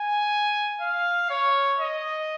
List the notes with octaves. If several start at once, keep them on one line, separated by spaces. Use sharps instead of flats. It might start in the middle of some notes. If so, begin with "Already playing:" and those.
Already playing: G#5
F5
C#5
D#5